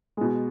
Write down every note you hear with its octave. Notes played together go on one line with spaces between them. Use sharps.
B2 G#3